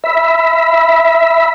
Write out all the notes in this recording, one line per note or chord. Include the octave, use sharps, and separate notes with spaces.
E5 B5